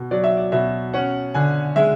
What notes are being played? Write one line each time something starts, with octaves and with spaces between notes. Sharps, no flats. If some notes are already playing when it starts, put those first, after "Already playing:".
Already playing: B2
F#3 D5
E5
D5
B2 E5
C#4 F#5
D3 G#5
G#3 E5